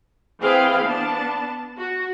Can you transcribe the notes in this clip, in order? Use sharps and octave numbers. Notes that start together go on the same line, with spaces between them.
E3 C4 G#4 B4 F5 G5
B3 D4 A5
F#4